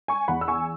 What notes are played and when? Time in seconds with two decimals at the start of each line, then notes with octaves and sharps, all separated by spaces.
0.08 G#5 C#6
0.28 E2 F#5 B5
0.41 E6
0.48 G#5 C#6